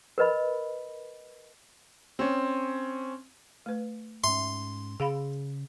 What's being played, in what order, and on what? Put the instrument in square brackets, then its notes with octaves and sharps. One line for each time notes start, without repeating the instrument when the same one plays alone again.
[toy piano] A#4 B4 D#5 B5
[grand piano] C4 C#4
[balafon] A3 B4
[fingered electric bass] G#2 C#4 [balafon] E5 [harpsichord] C6
[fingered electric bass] C#3 [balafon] G#4 F5 B5